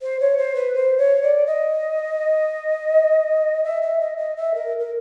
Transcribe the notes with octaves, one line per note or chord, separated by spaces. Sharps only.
C5
C#5
C5
B4
C5
C#5
D5
D#5
E5
E5
D#5
D#5
E5
A#4
A#4